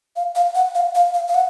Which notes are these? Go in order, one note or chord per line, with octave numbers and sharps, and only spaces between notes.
F5
F5
F#5
F5
F5
F5
F5
F#5